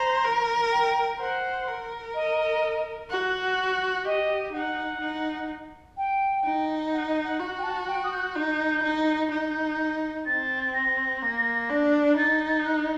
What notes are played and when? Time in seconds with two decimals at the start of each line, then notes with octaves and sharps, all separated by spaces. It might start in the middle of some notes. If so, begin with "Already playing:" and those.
Already playing: C5 A#5
0.24 A#4
0.71 G5
1.19 C5 F#5
1.67 A#4
2.14 D#5
3.10 F#4 F#5
4.05 G4 D#5
4.53 D#4 F#5
5.01 D#4
5.97 G5
6.44 D#4
6.93 F#5
7.07 D#5
7.24 F#5
7.40 F#4
7.58 G5
7.63 A5
7.88 G5
8.04 D#6
8.12 G6
8.19 F#6
8.35 D#4 G6
8.84 D#4
9.31 D#4 G6
10.26 C4 A6
10.74 A#6
11.22 A#3
11.70 D4
12.17 D#4 A6
12.65 F#6